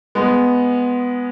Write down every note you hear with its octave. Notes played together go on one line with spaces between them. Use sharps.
G#3 B3